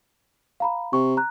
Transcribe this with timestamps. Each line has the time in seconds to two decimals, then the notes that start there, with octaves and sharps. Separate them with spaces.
0.60 F5 A#5 B5
0.93 C3 C#6
1.17 A#5 F#6